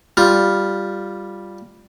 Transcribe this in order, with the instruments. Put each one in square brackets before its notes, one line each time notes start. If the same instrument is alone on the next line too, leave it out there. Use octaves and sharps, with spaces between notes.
[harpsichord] G3 F4